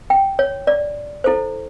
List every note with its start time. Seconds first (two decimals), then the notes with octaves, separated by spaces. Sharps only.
0.10 G5
0.39 C#5
0.67 D5
1.24 E4 A4 C5